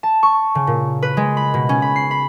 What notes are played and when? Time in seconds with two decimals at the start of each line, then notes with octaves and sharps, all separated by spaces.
0.03 A5
0.23 C#6
0.55 C#3
0.67 A#2
1.03 B4
1.17 G#3
1.37 B5
1.54 B2
1.69 C#4
1.82 B5
1.96 C7
2.11 B5